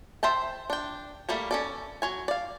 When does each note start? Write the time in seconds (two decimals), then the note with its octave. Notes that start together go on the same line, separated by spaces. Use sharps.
0.23 C5 E5 G5 A5
0.70 D4 G5
1.29 G3 A3 A#3 A#4
1.51 C#4 A4 D5
2.02 F#3 C#5 G#5
2.28 D5 F5